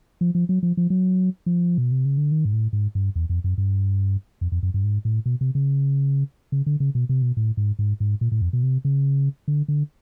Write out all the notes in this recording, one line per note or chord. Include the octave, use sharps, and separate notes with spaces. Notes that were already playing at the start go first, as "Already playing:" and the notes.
F3
F3
F#3
F3
F3
F#3
F3
B2
C3
C#3
D3
D#3
G#2
A2
G#2
G2
E2
F2
F#2
G2
F2
F2
F#2
G2
G#2
A2
B2
C3
C#3
C#3
D3
C#3
B2
C3
B2
A2
G#2
G#2
G#2
A#2
A2
F2
B2
C3
C#3
D3
D3